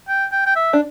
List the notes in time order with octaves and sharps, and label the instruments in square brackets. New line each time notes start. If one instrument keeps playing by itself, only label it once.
[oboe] G5
G5
G5
E5
[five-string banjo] D4